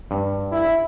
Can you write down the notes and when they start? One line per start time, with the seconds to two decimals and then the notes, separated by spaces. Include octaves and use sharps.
0.11 G2
0.52 E4